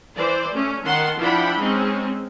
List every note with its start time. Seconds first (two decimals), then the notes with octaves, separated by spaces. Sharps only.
0.15 E3 C5 D5
0.54 A3 C#4
0.85 D#3 F#5 A5 C6
1.19 F3 D4 E4 F#5 G5 B5
1.58 G#3 C4 C#4 D#4 G#4